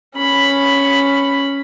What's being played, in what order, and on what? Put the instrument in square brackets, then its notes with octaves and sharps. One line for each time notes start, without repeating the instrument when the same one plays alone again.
[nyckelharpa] C#4 B5